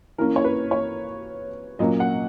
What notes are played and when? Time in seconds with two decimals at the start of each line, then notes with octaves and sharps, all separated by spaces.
0.18 E3 A#3 C#4 A#4
0.36 C#5
0.45 B4
0.71 C#5
1.79 A#2 F#3 A#3 C#4 D#5
2.00 F#5